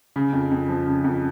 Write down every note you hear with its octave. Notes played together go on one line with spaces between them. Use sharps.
C#3
F2
F2
F3
C#3
F2